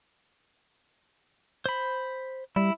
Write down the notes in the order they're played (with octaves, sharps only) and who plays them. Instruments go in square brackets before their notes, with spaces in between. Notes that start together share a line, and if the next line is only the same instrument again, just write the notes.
[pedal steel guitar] C5 B5
[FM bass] G3 [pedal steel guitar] E4